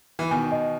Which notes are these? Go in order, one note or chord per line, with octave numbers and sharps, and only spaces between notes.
E3
B2 D#3 G#5
D#5